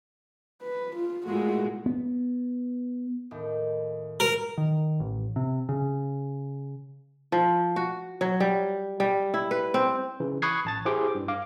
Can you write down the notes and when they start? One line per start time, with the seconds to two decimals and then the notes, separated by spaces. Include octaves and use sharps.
0.62 B4
0.96 F4
1.27 A#2 G#3 A3 E4 F#4
1.86 B3
3.31 D#2 A2
4.20 A#4
4.58 D#3
5.00 A1
5.36 C3
5.69 C#3
7.32 F3
7.76 F#4
8.21 F#3
8.40 G3
9.00 G3
9.34 E4
9.51 B4
9.74 C4
10.20 C#3 E3
10.42 B5 C#6 D#6 F#6 G#6 C7
10.65 A1 A5 A6
10.85 E4 G4 G#4 C5 D6
11.15 G2
11.28 F5 D6